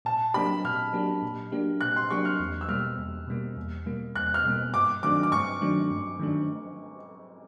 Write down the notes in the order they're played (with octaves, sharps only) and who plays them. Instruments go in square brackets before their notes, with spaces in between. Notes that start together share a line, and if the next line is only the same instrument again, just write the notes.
[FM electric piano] A#2 [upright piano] A5
[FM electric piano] F#3 A#3 D4 G4 [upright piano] B5
[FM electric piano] A#2 [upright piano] F6
[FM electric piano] F#3 A#3 D4 G4
A#2
F#3 A#3 D4 G4
[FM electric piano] A#2 [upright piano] F#6
[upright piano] C6
[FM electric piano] F#3 A#3 D4 G4 [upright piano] C#6
[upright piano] F6
[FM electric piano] E2
[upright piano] E6
[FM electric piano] B2 G3 A#3 [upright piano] F6
[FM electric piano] E2
B2 G3 A#3
E2
B2 G3 A#3
[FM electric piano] E2 [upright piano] F#6
[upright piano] F6
[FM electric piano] B2 G3 A#3
[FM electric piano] G2 [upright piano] D6
[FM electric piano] D#3 F#3 A3 D4 [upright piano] D6
[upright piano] D6
[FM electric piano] G2 [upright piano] C#6
[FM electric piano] D#3 F#3 A3 D4
G2
D#3 F#3 A3 D4